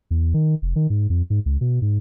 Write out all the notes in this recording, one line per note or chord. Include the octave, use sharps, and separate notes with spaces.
E2
D#3
F1
D#3
G#2
F2
G#2
C#2
B2
G#2